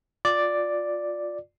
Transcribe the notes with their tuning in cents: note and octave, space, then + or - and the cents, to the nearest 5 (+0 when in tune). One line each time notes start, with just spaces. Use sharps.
F4 +20 D5 +0